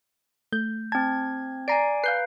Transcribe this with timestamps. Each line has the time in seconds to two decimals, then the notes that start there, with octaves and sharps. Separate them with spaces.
0.52 A3 G6
0.92 C4 A5 G#6
1.68 D5 G#5 A#5 C7 D7
2.04 B4 F5 G6 C7